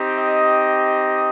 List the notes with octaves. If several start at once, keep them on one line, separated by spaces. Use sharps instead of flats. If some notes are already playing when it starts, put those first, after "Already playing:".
Already playing: C4 D#4 G4
D#5